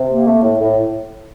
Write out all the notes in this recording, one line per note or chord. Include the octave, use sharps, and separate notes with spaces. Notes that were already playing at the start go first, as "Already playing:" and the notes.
Already playing: C3
A#3
A3
A2
A2